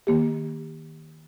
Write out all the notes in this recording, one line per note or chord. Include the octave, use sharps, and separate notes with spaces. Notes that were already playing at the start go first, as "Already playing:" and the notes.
D#3 A#3 G4